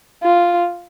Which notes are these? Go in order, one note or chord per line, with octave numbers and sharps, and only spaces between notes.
F4